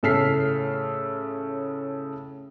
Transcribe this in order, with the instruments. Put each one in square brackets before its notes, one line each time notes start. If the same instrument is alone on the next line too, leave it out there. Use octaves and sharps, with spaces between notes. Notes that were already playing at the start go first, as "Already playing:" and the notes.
[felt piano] A2 C#3 A4 F6 B6 C7